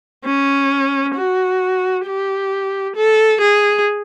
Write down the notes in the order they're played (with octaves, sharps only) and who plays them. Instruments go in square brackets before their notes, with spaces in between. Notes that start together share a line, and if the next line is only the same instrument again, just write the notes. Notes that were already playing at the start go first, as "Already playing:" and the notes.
[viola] C#4
F#4
G4
A4
G#4